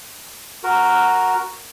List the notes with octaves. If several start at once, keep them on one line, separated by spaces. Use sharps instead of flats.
F#4 A#4